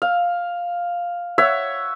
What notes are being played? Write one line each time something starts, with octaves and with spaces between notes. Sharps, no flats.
F5
C#5 E5 F#5